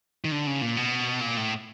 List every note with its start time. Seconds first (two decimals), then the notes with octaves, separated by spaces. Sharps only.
0.24 D#3
0.32 D3
0.47 C#3
0.62 A#2
0.77 B2
1.21 A#2
1.37 A2